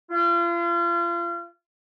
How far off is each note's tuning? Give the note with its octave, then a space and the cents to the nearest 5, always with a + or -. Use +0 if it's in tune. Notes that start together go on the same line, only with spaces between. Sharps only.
F4 -35